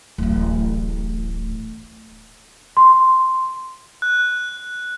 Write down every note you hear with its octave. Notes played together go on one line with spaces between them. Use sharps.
D1 A1
C6
F#6